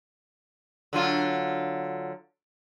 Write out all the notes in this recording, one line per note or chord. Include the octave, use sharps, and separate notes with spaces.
D3 F#3 F4